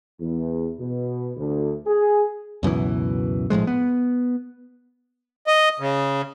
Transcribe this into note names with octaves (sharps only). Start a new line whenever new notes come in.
E2
B2
D2
G#4
C#2 F#2 B2 E3
A#1 A2 F3 G#3
B3
D#5
C#3